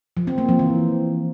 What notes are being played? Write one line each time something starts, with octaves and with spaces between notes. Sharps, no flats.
F3
C4
A#3
F3
E3